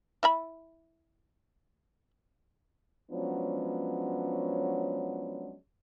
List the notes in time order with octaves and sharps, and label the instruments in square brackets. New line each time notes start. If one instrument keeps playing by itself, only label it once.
[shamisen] E4 E5 B5
[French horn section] F3 F#3 G#3 B3 C#4 D4